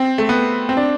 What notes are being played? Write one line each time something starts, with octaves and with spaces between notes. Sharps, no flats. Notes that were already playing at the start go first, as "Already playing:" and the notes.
Already playing: C4
A3
B3
C4
D4